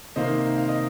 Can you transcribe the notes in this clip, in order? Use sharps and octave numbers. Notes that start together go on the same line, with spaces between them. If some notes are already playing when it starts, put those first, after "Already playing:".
C3 D#3 A#3 C5 D#5
F5
D#5